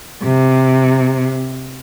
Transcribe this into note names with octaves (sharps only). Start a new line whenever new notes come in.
C3